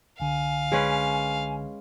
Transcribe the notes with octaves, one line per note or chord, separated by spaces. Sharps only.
C2 D3 F5 G#5
G#3 C#4 B4